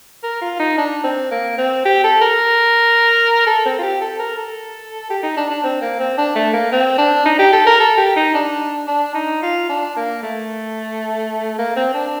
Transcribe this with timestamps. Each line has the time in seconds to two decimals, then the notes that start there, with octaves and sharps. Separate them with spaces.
0.23 A#4
0.42 F4
0.59 D#4
0.78 D4
1.04 C4
1.31 A#3
1.58 C4
1.85 G4
2.04 A4
2.21 A#4
3.47 A4
3.66 C4
3.79 F4
3.83 G4
4.01 A4
4.19 A#4
4.38 A4
5.10 G4
5.23 D#4
5.37 D4
5.50 D4
5.64 C4
5.82 A#3
5.99 C4
6.18 D4
6.36 A3
6.54 A#3
6.72 C4
6.98 D4
7.26 D#4
7.39 G4
7.53 A4
7.66 A#4
7.80 A4
7.98 G4
8.16 D#4
8.34 D4
8.88 D4
9.14 D#4
9.42 F4
9.69 D4
9.96 A#3
10.23 A3
11.59 A#3
11.76 C4
11.94 D4